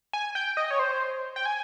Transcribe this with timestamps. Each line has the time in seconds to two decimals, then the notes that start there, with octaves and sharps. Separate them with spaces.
0.13 G#5
0.35 G5
0.57 D#5
0.71 C#5
0.79 C5
1.36 G5
1.46 G#5